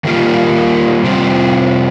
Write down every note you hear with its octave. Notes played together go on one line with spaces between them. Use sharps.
D#3 G3 A#3 F4 A#4
C3 G3 C4 F4 C5